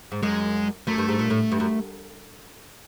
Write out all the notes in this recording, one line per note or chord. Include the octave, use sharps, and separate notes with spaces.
G#2
F#2 G#3
F#2 A3
G2
G#2
A#2
A2
G2
F#2